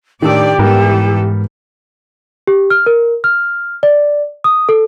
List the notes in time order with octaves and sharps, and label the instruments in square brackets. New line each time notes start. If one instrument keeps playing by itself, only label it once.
[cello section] A2 D5 [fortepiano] D#3 D4 E6 [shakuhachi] G4
[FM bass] G#2 [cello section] E3 A4 [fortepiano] G3 B3 A#4
[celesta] G4
F6
A#4
F6
D5
D#6
A4